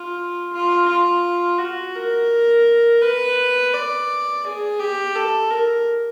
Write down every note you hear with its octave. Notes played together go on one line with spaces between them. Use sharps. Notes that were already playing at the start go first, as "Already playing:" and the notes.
Already playing: F4
F4
F4
F#4
A#4
B4
D5
G#4
G4
A4
A#4